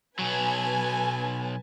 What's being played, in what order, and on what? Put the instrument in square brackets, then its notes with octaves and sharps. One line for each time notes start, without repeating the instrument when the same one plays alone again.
[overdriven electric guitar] B1 F#3 [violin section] B4 G#5 A5